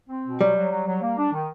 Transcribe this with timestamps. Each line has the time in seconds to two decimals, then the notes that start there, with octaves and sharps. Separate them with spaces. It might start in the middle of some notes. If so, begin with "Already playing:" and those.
0.09 C4
0.24 B2
0.40 F#3 G3
0.56 F#3
0.70 F#3
0.87 F#3
1.02 A#3
1.17 D4
1.33 D#3